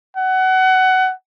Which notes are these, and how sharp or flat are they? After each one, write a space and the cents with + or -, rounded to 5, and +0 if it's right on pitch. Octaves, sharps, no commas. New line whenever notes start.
F#5 +20